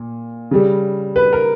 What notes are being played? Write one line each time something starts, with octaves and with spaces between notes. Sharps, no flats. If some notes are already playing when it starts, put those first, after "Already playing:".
Already playing: A#2
C#3 G3
B4
A#4